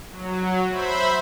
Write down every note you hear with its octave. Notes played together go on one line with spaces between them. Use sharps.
F#3
C5 E5 B5